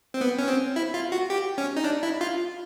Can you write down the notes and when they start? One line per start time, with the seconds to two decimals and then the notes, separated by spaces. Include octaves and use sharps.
0.14 C4
0.21 B3
0.39 C#4
0.48 C4
0.76 E4
0.94 F4
1.12 F#4
1.30 G4
1.58 C#4
1.77 D#4
1.84 D4
2.03 E4
2.21 F4